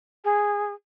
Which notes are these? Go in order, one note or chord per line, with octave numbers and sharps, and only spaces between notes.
G#4